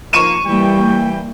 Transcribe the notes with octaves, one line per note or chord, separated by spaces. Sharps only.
F3 A#3 C#6 D#7 E7
E3 G3 A#3 G5